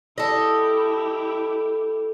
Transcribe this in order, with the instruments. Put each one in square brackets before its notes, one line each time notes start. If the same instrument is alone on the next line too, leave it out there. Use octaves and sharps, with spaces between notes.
[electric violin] E4 G4 [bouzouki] A4 D#5